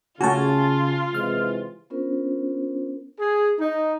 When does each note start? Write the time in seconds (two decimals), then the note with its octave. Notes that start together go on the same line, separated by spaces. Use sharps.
0.21 C#3 A3 C#4 F4 F#4 G#5 A5
1.14 C3 E3 G#3 F6
1.90 B3 C#4 D4 F4 A#4 C5
3.19 G#4
3.59 D#4